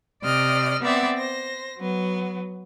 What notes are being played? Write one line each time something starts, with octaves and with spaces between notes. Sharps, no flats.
C3 D5 D#5 F6
B3 C4 D5 E5 F#5
C5 A#6
F#3 B3